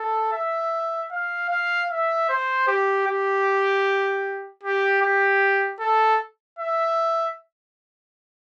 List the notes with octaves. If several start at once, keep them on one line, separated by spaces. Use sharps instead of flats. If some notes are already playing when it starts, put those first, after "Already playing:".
Already playing: A4
E5
F5
F5
E5
C5
G4
G4
G4
G4
A4
E5